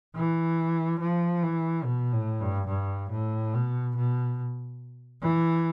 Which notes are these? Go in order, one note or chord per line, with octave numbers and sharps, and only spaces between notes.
E3
F3
E3
B2
A2
G2
G2
A2
B2
B2
E3